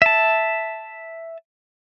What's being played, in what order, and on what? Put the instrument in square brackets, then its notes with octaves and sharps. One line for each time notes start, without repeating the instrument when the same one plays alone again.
[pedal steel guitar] E5 A5